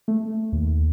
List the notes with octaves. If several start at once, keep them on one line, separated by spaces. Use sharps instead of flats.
A3
D#2